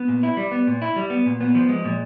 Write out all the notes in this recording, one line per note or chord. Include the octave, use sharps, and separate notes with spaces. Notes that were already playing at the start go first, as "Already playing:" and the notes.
Already playing: B3
A#2
E4
G3
B3
A#2
E4
G3
B3
A#2
B3
F3
G#3
A#2